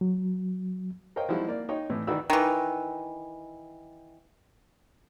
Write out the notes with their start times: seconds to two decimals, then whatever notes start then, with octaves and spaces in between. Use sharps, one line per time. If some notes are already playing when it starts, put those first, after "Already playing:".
0.01 F#3
1.16 A#4 C5 C#5 D#5 F5 G5
1.29 F3 G3 G#3 D#4 E4 F#4
1.48 A#3 D5
1.69 D#4 C#5 G5
1.90 A2 E3
2.07 D#3 E3 F#4 D5 B5 E6
2.30 D#3 E3